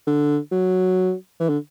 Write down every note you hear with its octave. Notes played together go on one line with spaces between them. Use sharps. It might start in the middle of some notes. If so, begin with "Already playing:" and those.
D3
F#3
E3
D3